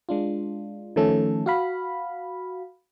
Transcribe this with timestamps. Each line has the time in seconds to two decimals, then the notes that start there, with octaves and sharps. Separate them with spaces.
0.09 G#3 D4 F4
0.96 D#3 F3 A3 C#4 A4
1.46 F#4 F5 B5